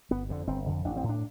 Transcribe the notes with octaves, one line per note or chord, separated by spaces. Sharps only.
G1 B3
F2 D3
G1 C4
F2 D3
A1 D4
C4
A2
D4